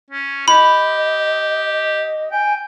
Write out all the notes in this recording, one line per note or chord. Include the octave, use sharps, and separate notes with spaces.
C#4
G4 D#5 B5
G5 G#5